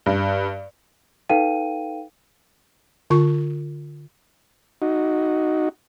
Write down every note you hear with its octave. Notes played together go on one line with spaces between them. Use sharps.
G2
D#4 A4 B4 F5 G5 D#7
D3 F4 C#6
D#4 F#4